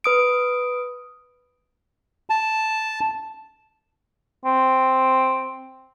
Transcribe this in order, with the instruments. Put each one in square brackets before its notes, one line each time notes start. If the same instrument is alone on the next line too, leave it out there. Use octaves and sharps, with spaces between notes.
[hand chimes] B4 D#6 D7
[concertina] A5
[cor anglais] C4